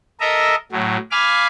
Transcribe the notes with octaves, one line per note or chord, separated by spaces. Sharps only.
A4 A#4 D#5 E5 A#5
A2 F#3
F5 G#5 B5 D6 F6